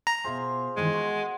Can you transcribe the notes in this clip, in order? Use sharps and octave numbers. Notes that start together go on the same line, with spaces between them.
A#5
B2 F4 G#4 C5 E5
G2 D#3 E3 G#3
F#4 A#4